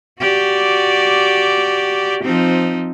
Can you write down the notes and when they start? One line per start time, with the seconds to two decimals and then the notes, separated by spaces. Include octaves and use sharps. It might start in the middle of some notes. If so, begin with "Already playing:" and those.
0.20 F#4 G4 D5
2.24 F3 C4 D#4